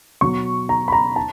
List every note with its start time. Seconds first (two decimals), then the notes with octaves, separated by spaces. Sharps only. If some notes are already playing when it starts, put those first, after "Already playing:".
0.21 B2 F#3 C#6
0.69 A#5
0.88 B5
0.92 A#5
1.16 A5